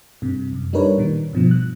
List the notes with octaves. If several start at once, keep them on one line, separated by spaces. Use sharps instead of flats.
G2 C3
F#2
G3 D4 D#4 A#4 B4 C#5
A#2 D#3
G2 B2 F3
F#6